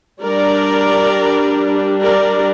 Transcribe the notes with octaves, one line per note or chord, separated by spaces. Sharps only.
G3 D4 A#4 D5
A#4 D5